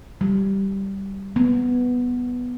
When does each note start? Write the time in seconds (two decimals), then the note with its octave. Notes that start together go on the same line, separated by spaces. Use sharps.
0.21 G3
1.36 B3